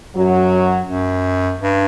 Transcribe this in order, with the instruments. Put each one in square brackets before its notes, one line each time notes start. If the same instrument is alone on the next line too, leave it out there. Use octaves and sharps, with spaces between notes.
[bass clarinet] F#2 [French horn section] F#3
[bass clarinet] F#2
G2